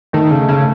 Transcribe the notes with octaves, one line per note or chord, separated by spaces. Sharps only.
D#3 A3
C#3 A3
C#3 A3